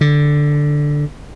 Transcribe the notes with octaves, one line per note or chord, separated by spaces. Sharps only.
D3